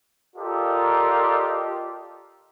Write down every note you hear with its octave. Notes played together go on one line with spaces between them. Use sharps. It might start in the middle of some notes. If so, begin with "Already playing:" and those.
F4 G4 A4 A#4 D5 D#5